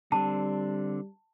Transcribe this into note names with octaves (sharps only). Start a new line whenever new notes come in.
D3 G3 C4 D4 A5